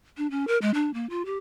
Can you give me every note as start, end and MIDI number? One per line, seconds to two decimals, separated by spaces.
0.17 0.30 62
0.31 0.47 61
0.48 0.58 70
0.62 0.71 56
0.74 0.93 62
0.94 1.06 58
1.10 1.25 65
1.25 1.38 67